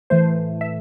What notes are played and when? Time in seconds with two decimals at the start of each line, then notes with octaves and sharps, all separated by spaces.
0.10 A2 E3 A3 C5
0.61 E5